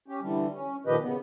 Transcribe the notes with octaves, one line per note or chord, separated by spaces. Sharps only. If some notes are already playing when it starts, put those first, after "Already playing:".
C#4 G4
D3 E3 G3
C#4
A#2 D#3 F3 G4 B4 D#5
C#3 B3